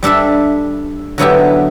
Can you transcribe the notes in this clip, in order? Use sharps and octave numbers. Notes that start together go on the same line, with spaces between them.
G3 D4 A4 E5
D3 F#3 B3 E4 G4